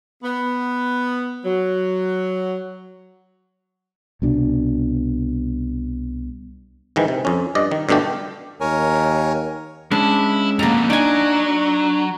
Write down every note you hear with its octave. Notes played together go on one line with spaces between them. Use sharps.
B3
F#3
C2 B2 D4
G#2 D#3 E3
C3
F2 C#4
G2 D5 D#5
D#3
G2 B2 D3 A3 G4
D#2 A#4 C#5 G#5
G#3 C#4 D4 E4
F2 B2 A#3 A#5
F#3 D4 D#4 G#5